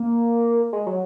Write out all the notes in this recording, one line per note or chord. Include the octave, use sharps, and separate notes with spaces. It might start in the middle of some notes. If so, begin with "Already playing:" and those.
Already playing: A#3
G#3
F#3